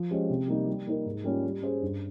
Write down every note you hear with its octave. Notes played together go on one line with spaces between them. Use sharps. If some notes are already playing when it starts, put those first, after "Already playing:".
Already playing: F3
G#3 C#4 G4 C5
C3
G3 A#3 D#4
G3
A#3 D#4 A#4
G#2
G3 A#3 C#4 F4
G3
C#4 G#4 C5
G2